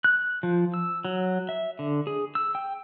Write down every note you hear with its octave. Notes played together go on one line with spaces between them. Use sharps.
F#6
F3
E6
F#3
E5
D3
G#4
E6
G5